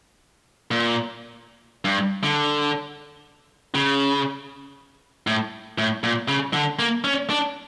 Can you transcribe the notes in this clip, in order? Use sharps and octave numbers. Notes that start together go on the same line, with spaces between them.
A#2
G2
D3
C#3
A2
A2
A#2
C#3
D3
A#3
C#4
D4